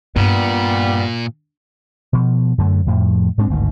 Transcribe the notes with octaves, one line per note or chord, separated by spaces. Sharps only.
G2 A#2 G3 B3
B2 F3
F#2 D3 A3
F2 A2 F3
G#2 G#3 C4 D4
G#1 D2 G2 D#3